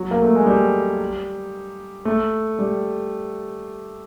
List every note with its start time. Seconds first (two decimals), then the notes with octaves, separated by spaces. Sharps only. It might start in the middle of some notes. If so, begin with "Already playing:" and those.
Already playing: F#3
0.11 A#3
0.22 A3
0.35 G#3
0.46 G3
2.05 A3
2.59 G3